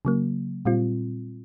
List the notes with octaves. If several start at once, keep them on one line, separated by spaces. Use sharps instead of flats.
C#3 F#3 A#3
A#2 G3 C4 F4